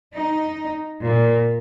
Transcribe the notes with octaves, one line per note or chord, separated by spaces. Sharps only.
D#4
A#2